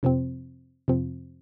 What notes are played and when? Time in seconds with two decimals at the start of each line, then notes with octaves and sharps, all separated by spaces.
0.03 F2 C3 F3 C4
0.88 F2 C3 F3 C4